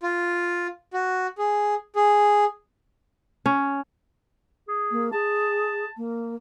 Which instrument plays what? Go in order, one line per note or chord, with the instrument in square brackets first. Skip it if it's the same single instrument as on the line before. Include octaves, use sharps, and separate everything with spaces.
[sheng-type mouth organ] F4
F#4
G#4
G#4
[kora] C#4
[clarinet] G#4
[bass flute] A#3
[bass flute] G#4 [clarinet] A5
[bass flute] A#3